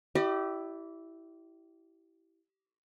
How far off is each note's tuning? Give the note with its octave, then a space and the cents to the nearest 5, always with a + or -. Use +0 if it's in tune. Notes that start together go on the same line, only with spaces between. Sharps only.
E4 +0 G4 -25 D5 +40